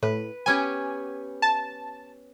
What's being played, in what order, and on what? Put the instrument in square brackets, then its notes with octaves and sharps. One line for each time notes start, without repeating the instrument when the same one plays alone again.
[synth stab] A2 [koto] B4
[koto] B3 C#4 G4 [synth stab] G#5
[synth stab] A5